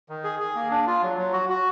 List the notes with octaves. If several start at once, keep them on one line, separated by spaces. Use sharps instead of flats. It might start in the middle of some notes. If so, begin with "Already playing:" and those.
D#3
G#4
G#4
A#3
D4
F4
F#3
F#3
F#4
F#4